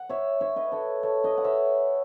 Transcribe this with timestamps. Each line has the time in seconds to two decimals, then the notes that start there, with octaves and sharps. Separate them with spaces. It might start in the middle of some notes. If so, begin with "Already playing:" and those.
Already playing: F#5
0.09 C#5 E5
0.41 C#5 E5
0.56 B4 D#5
0.72 A4 C#5
1.03 A4 C#5
1.24 B4 D#5
1.38 F#5
1.44 C#5 E5